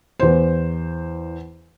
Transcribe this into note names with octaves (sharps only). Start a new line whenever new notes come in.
E2 C5